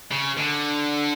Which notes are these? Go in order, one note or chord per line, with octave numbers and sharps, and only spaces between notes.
C#3
D3